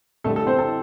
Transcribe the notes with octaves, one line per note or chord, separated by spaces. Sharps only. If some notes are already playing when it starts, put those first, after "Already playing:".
F2 D3 G3 A3 A4
A3 A4
C4 C5
A4 A5